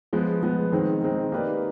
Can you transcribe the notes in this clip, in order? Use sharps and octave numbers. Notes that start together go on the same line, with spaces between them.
F3 G#3 B3
F3 G#3 B3
D#3 G#3 C4 D#4
D#3 G#3 C4 D#4
A#3 D#4 G4 B4 D5